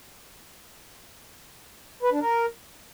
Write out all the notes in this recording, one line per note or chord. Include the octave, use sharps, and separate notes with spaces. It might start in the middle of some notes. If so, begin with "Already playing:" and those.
B4
D4
A#4